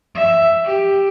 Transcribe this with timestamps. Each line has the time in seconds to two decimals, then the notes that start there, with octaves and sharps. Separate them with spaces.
0.15 E5
0.64 G4